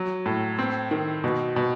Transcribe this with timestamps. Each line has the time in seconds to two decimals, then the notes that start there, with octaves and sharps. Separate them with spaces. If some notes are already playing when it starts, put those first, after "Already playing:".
Already playing: F#3
0.26 A2
0.59 C4
0.91 D#3
1.24 B2
1.56 B2